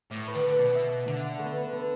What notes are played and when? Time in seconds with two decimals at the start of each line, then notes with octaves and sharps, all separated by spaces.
0.11 A2 D5
0.27 B4
0.35 D3
0.43 B4
0.59 B2 D5
0.75 E5
0.91 D5
1.08 D3 E5
1.20 F#5
1.39 A3
1.44 B3
1.57 B3
1.73 B3